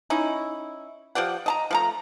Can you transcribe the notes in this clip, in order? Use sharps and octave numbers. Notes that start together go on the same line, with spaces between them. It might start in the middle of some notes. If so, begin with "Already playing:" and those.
C#4 D#4 E4
F3 G4 D5 F#5
D#5 A5 A#5
F3 A3 A#5